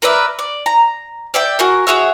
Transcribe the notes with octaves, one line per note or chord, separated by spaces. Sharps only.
A#4 B4 D5 E5
D5
A#5
D5 E5 G5
F#4 G#4 A#4
F#4 G#4 C#5 E5